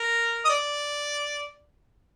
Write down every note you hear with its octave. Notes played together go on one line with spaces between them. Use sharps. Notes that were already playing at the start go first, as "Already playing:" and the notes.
Already playing: A#4
D#5
D5